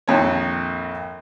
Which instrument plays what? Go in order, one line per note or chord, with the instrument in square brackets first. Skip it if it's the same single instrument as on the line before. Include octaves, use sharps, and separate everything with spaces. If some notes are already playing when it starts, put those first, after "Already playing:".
[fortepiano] A#1 F2 D#3 C#5